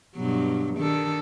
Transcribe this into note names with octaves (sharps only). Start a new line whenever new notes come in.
G2 B2 F#3
D#3 D4 A4